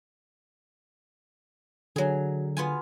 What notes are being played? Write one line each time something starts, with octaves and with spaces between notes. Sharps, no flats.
D3 F#3 G#4
B3 F4 G#5